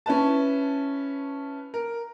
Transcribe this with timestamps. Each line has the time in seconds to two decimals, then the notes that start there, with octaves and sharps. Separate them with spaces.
0.06 C#4 E4 B4 A5
1.74 A#4